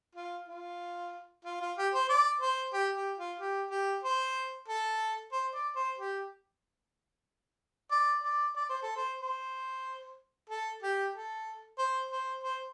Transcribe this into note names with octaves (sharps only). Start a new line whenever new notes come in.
F4
F4
F4
F4
G4
C5
D5
C5
G4
G4
F4
G4
G4
C5
A4
C5
D5
C5
G4
D5
D5
D5
C5
A4
C5
C5
A4
G4
A4
C5
C5
C5